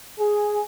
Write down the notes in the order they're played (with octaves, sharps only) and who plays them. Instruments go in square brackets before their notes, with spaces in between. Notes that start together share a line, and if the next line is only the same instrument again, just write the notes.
[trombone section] G#4